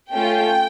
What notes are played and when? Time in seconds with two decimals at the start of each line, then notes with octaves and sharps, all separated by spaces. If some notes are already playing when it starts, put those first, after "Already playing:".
0.11 A3 C#4 F4 G5